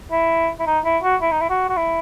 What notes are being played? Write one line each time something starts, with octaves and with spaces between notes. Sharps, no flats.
E4
E4
D#4
E4
F#4
E4
D#4
E4
F#4
F#4
E4